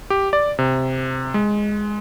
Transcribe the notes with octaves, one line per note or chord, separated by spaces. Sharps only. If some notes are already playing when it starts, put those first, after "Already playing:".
G4
D5
C3
G#3